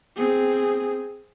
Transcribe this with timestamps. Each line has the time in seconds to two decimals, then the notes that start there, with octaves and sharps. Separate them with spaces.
0.17 C4 G#4